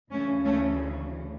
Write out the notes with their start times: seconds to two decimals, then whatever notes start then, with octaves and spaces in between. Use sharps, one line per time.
0.12 D2 C#3 E3 A3 C#4
0.46 A3 C#4